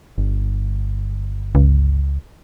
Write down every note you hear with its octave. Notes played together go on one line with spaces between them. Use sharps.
G1
C#2